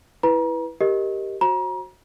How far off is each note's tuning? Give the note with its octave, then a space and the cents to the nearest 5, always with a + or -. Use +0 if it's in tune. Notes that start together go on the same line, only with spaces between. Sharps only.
E4 +0 B4 -5 A#5 +35
G4 +0 A#4 +0 D#5 +0
F#4 -5 C5 +35 A#5 +35